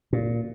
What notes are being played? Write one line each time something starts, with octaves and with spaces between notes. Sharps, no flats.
A#2